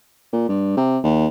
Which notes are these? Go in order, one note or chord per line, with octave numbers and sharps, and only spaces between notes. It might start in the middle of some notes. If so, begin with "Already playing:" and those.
A#2
G2
C3
D#2